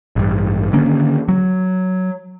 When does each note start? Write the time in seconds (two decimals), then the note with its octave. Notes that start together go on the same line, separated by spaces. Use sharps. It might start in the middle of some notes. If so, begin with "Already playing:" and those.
0.16 A1 G2
0.73 D3 D#3 A#3 C#4
1.28 F#3